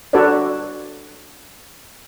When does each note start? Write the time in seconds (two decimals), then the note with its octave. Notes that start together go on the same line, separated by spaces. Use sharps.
0.13 D4 F#4 A4 B4 C#5 D5